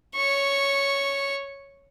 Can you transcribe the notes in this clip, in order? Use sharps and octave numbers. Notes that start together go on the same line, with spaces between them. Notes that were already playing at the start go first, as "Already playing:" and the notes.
C#5 C#6